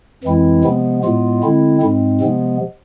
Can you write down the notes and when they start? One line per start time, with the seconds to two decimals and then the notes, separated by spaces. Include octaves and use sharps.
0.24 F2 E3 G#3 C4 E4
0.64 C3 F3 G#3 B3
1.04 A2 G#3 B3 F4
1.43 D3 G#3 C4 E4
1.81 G#2 G#3 C4
2.21 C3 F3 G#3 B3